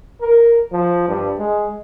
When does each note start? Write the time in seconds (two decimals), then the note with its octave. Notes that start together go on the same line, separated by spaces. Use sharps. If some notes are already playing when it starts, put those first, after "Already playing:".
0.21 A#4
0.72 F3
1.08 G2
1.39 G#3